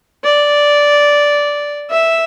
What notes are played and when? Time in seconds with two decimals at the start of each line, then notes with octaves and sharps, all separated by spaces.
0.24 D5
1.90 E5